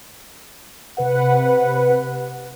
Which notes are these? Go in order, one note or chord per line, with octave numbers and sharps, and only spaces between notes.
C3 B4 F#5